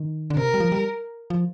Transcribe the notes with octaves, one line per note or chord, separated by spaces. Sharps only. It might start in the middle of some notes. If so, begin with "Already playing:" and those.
Already playing: D#3
D3
C3 A#4
G3
F3
G3
F3